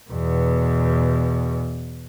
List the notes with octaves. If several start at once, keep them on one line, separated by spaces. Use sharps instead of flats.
E2 B2